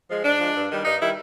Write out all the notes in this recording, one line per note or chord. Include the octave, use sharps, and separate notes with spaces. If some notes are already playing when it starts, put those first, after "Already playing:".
F3 G#3
G#2 D4
F3 G#3
G2
D#3 G3
G2 D#4
D#3 G3 E4